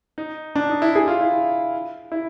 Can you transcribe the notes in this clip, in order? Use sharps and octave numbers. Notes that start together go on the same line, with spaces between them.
D#4
D4
D#4
E4
G#4
F4
E4
E4